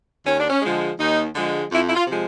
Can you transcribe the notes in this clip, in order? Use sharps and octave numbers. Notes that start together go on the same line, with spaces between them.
D#2 C#4
D4
C#4
D3 F3 G#3
D#2 D#4
D3 F3 G#3
F2 E4
E4
F4
C3 F3 G#3